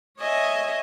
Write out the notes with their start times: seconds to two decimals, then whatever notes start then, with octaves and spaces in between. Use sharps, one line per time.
0.19 C#5 D#5 E5 G#5